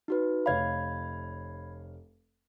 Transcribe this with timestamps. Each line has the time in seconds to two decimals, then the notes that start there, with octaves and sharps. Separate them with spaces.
0.08 D#4 F#4 B4
0.46 F1 C#5 F5 B5 G#6